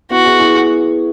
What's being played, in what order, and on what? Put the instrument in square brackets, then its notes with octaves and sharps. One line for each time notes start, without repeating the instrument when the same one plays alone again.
[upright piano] B3 E4 [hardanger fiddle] F#4
[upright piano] E4 G#4
E4 G#4